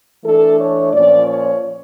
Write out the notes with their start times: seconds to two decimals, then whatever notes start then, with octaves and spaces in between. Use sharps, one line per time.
0.24 E3 A3 D4 A4
0.59 C#5
0.92 A#2 F3 C#4 D5
1.27 C#5